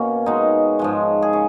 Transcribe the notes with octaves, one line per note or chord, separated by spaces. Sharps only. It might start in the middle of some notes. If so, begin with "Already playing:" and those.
Already playing: B2 A#3 C#4
B2 G#3 D#4
G#2 F3 G#3
G#4
C#3